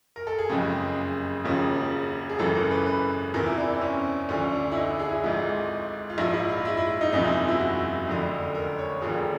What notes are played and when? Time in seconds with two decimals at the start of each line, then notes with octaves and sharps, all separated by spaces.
0.16 A#4
0.27 A4
0.39 G#4
0.49 F#1 F2 C#3 G4
1.45 E1 D#2 C#3 F3
2.29 G#4
2.39 G#1 F#2 C#3 E3 A4
2.55 A#4
2.71 B4
2.86 B4
3.34 E2 C3 E3 A#4
3.46 E4
3.57 D4
3.74 C4
3.81 C#4
4.29 D2 D3 F3 C#4
4.52 D4
4.71 E4
4.76 D#4
4.88 D4
4.99 G#4
5.12 E4
5.23 G#1 G#2 F3
6.10 F4
6.18 A#1 G#2 F3 E4
6.33 E4
6.49 F4
6.65 E4
6.77 E4
7.01 D#4
7.12 F#1 E2 C3 F3 D#4
7.24 E4
7.48 E4
7.59 F#4
8.07 F1 F2 D3
8.55 A#4
8.78 C#5
9.01 E1 D#2 D3 F3 G#4